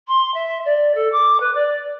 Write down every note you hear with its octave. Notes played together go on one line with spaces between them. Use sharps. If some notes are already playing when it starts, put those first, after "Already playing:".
C6
E5
D5
A4
D6
B4
D5